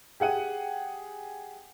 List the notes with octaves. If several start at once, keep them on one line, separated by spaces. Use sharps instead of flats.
G4 G#4 F#5 D#7